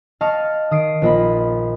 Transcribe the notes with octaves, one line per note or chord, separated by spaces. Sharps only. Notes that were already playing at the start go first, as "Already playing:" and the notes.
D#5 F5 A5 C#6 F6
D#3 D#6 C7 D7
A#1 A#3 F4 D#5 B5